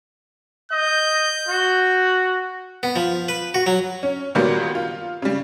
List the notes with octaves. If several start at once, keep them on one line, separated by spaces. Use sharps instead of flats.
D#5 G6
F#4
B3
F3
B4
F#4
F#3
C#4
A#2 D#3 F#3 G3 A#3 B3
F4
C#3 G3